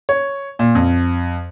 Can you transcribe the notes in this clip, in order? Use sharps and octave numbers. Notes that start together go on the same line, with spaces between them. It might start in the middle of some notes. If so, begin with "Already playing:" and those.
C#5
A#2
F2